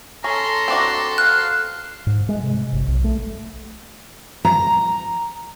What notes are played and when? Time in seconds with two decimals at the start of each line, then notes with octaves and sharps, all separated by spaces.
0.24 C#4 A4 A#5 C6
0.68 C4 D4 F#4
1.18 F5 F#6
2.07 G#2
2.29 G#3
2.43 C3
2.73 G1
2.88 B1
3.04 A3
4.45 A#5